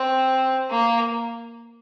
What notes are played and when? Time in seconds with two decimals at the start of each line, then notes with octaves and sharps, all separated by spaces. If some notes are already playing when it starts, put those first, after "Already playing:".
Already playing: C4
0.70 A#3